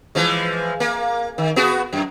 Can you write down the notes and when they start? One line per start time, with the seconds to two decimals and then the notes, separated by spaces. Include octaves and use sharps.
0.15 E3 F3 G#3
0.80 A#3
1.38 D#3
1.56 B3 F#4 G#4
1.93 F#2